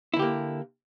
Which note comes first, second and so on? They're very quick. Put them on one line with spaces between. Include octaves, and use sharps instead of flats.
E4 D3 G4 A#3